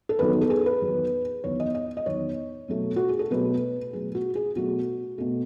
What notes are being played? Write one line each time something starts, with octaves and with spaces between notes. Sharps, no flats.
A4
E2 D#3 F#3 B4
A4
G#4
B4
E2 D#3 F#3
E2 D#3 F#3 C#5
D#5
D#5
D#5
E2 D#3 F#3 C#5
B2 F#3 A3
F#4
G#4
A4
B2 F#3 A3 B4
B2 F#3 A3 G#4
F#4
G#4
B2 F#3 A3 F#4
B2 A3